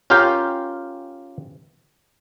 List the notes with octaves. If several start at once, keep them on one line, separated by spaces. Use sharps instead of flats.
C#4 F4 G4 A#4 F5 G5